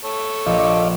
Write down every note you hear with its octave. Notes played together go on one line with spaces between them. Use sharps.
A4 C#5
A#1 D#5 F5 D6